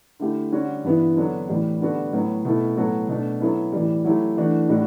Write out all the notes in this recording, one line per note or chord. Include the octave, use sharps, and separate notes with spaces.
D3 A3 E4 G4
D3 G3 C#4 F#4
G2 E3 B3 E4
D3 F#3 B3 D4 A4
A2 E3 G3
D3 G3 B3 F#4 A4
A2 F#3 B3
B2 A3 E4 A4
A2 F#3 B3 F#4 A4
B2 A3 D4
F#3 B3 E4 A4
A2 E3 G3
F#3 A3 E4 G4
E3 A3 D4 F#4
A2 G3 D4 F#4